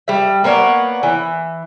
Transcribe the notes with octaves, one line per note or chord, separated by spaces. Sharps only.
G3 E5
A#3 B3 C#5 D5
E3